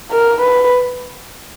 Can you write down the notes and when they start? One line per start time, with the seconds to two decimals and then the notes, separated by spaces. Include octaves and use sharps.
0.11 A#4
0.41 B4